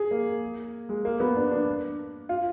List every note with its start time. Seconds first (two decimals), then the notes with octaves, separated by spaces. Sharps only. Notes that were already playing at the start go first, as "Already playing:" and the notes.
Already playing: G#4
0.11 A#3
0.89 G#3
1.05 A#3
1.20 B3
1.36 D4
1.51 D4
2.29 F4